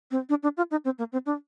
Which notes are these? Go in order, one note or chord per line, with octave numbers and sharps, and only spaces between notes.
C4
D4
D4
F4
D#4
C4
A#3
C4
D4